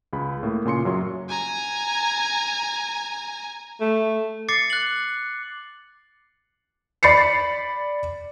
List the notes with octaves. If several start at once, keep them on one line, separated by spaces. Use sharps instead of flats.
C#2 G#4 B5
A2 A#3
A#2 C#3 C6 C#7
F#2 F#3 C#5 C6
G#5 A#5
A3
D6 A6 C7 C#7
F#6 F#7
D5 B5 A6 C7 C#7